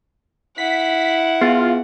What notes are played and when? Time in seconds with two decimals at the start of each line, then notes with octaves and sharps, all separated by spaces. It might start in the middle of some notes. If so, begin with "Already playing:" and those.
0.58 E4 F#5 B6
1.41 B3 F4 G#4